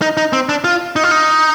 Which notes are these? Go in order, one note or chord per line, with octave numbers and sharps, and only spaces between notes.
D#4
D#4
C4
D4
F4
D#4
F4
D#4